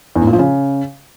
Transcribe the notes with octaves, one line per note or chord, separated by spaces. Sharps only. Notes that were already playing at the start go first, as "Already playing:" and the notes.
E2
A2
A#2
F3
C#3